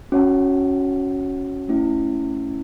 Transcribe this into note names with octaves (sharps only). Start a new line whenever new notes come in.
C#4 F#4 C#5 F#5 A5
A3 C#4 E4